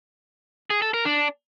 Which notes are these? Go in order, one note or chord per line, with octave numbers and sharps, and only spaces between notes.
G#4
A4
A#4
D4